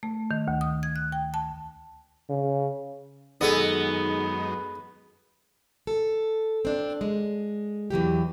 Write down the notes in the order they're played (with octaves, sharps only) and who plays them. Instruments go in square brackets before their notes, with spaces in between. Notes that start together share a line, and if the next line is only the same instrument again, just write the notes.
[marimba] A3
D#3
D2
D#6
G#6
F#6
G5
A5
[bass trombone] C#3
[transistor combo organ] F#2 G#3 D#4 [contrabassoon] D#3 [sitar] B3 [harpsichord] G#4 A4 D#5
[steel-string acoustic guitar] A4
C4 D4
G#3
E2 E3 F#3 G4